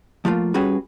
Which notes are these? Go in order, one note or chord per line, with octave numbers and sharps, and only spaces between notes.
F3 A3 A#3 F4
G3 C#4 F#4 G#4 B4